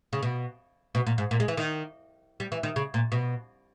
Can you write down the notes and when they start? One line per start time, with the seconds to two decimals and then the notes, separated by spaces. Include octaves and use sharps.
0.13 C#3
0.23 B2
0.95 B2
1.07 A#2
1.18 G#2
1.31 A#2
1.40 G#3
1.48 E3
1.57 D#3
2.40 G3
2.52 E3
2.63 D#3
2.76 C#3
2.94 A#2
3.12 B2